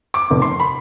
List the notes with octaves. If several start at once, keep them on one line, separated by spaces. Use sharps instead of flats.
D6
F1
C6
B5